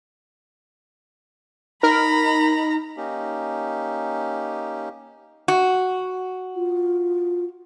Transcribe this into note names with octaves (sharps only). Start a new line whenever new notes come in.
D#4 A#4 A#5 B5
A#3 C#4 D#4 G4
F#4
F4